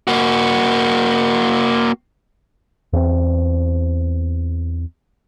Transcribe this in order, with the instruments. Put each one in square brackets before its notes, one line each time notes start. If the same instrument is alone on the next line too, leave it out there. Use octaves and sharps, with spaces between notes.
[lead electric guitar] A#3 F#4
[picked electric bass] E2 C4